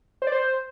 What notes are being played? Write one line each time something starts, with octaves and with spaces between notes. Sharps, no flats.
C5
D5
C5